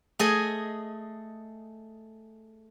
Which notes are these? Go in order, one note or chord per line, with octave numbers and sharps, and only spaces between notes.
A3 G#4 D#5